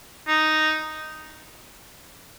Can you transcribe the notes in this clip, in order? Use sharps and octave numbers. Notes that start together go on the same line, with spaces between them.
D#4